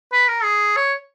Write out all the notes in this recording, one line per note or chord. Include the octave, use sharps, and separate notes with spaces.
B4
A#4
G#4
C#5